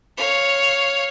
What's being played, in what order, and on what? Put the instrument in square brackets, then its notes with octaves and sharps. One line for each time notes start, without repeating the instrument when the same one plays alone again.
[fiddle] C#5 F5